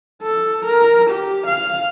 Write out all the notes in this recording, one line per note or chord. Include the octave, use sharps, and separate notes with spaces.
A4
A#4
G4
F5